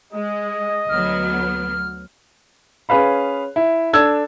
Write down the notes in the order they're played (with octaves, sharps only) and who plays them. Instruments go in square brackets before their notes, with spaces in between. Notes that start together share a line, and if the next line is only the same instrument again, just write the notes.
[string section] G#3 [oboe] D#5
[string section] D2 F#3 B3 [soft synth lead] F6
[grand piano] C#4 G#4 B4 F5 B5
E4
D4 A4 E6 G#6